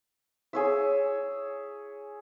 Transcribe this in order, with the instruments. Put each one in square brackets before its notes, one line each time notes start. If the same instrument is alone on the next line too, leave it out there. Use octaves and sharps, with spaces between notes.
[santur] G#4 C#5 E5